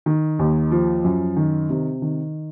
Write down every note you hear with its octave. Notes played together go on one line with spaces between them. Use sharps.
D#3
D#2
F3
F#2
D#3
C3
D#3